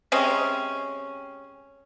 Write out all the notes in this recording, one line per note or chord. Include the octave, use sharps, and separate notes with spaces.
C3 G#3 C4 C#4